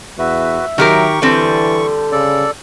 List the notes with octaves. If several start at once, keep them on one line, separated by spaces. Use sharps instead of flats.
E2 F#4 B4 E5
D#3 F#3 G4 A#4 C#6
D3 E3 G3 C4 A4
C#3 A4 D5